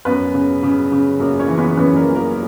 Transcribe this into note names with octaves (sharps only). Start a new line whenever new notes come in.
F#2 B3 B4
C#3
C#3
C#3
F#2 A#3 A#4
C#4 C#5
E3
B3 B4
F#2 B3 B4
A#3 A#4
E3
A#3 A#4